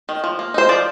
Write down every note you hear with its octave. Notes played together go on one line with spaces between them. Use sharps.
D#3
F3
A#3
D#4 C5
F3 D5